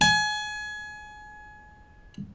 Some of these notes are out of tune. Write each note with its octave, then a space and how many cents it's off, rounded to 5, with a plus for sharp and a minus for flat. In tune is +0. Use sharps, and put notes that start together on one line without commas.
G#5 +25